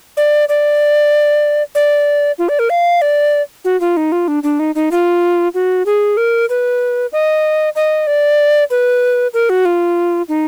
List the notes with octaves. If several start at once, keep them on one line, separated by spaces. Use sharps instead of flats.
D5
D5
D5
F4
D5
A#4
F5
D5
F#4
F4
D#4
F4
D4
D4
D#4
D#4
F4
F#4
G#4
A#4
B4
D#5
D#5
D5
B4
A#4
F#4
F4
D#4